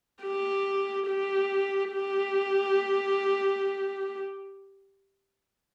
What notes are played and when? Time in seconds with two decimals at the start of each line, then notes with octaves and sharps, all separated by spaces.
0.23 G4
1.07 G4
1.91 G4